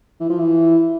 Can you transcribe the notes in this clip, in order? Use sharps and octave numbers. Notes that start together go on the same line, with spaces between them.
E3
F3
E3